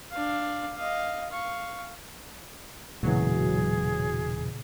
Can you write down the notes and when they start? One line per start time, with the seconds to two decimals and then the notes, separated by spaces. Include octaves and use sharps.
0.11 D4 F5
0.76 D#5 F5
1.30 F5 C#6
3.03 E1 A#2 C#3 E3 F#3 G#4